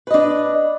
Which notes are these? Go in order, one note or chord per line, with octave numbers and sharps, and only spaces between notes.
D4 B4 D#5